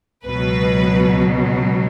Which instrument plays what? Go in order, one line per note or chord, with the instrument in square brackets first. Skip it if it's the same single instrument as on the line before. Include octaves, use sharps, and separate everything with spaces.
[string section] C#2 B2 F#3 B4